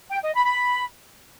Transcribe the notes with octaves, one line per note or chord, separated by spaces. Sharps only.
G5
D#5
B5
B5